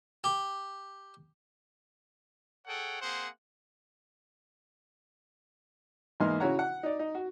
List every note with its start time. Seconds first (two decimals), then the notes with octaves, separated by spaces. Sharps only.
0.24 G4
2.67 G#4 A4 C#5 F#5 G5
3.02 A#3 C4 G#4 C5 F#5
6.20 E2 G#2 A#3 D#4 C6 F6
6.40 C#3 E4 F#4 C#5 F#5 A#5
6.59 F#5
6.83 D#4 D5
6.99 D#4
7.15 F#4